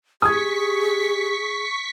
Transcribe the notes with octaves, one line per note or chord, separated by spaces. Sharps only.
G4 G#4 C#6 D#6 G#6 B6